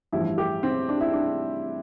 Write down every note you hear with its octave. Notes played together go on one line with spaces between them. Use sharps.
A1 G2 F3 E4
G4
C4
D4
E4
D4